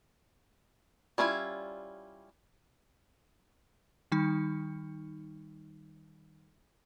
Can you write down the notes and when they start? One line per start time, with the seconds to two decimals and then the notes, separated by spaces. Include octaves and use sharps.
1.18 G3 C#4 D4 E4 F4
4.12 D#3 G3 D#4